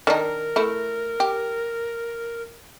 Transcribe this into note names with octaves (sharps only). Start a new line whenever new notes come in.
D#3 D4 D#4 A#4
A3 E4
G4